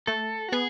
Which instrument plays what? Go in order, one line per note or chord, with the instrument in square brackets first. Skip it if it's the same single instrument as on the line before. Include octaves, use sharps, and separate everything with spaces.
[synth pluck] A3 [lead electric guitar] A4
[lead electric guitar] F#4
[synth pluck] B3 [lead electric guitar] G#4